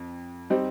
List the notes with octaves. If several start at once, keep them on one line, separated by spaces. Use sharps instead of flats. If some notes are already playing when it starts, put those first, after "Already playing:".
Already playing: F2
G3 C4 D#4